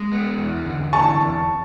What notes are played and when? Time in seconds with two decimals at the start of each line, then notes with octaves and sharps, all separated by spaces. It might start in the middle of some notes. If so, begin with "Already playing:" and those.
Already playing: G#3
0.12 B3
0.38 E2
0.65 D3
0.93 E3 A5 C#6
1.20 E2